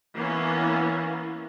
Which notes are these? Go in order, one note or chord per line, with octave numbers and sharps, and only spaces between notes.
E3 A#3 B3 C#4